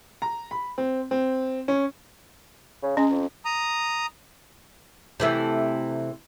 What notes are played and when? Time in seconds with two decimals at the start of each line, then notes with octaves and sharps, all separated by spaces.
0.22 A#5
0.51 B5
0.78 C4
1.11 C4
1.68 C#4
2.83 C#3
2.97 G#3 C#4
3.11 F2
3.45 A#5 D#6
5.20 C3 E3 A3